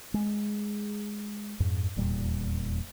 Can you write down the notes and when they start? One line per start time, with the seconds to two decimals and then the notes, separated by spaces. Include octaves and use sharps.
0.14 G#3
1.60 F2 G#2
1.96 D#1 E2 A#2 G3